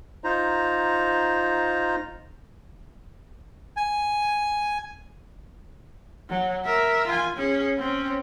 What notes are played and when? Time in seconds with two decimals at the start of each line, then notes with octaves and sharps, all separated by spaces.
0.24 D#4 F4 C5 A#5
3.77 G#5
6.29 F#3
6.65 A#4 E5
7.08 F4 G#5
7.37 C#4 G#4
7.78 C4 C#4